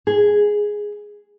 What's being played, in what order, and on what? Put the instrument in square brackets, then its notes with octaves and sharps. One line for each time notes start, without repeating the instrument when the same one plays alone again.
[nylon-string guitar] G#4